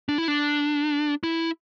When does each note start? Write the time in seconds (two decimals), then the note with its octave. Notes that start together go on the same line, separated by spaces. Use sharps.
0.09 D4
0.18 E4
0.28 D4
1.23 E4